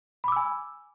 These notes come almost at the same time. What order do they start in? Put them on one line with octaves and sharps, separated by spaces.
B5 D6 E6 G#5